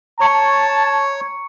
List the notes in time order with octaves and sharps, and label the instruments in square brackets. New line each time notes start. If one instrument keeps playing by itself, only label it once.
[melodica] C#5 [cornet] A5 [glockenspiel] A#5 C#6 C#7